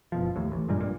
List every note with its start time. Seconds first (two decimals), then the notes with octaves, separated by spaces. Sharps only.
0.12 F#1 B2 F3
0.36 D#2 A2
0.52 A1
0.68 G2 A#2 G3 G#3
0.80 A#1 G2 A#2